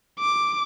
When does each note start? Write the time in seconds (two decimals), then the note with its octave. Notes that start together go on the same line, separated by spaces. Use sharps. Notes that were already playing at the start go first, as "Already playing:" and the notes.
0.19 D6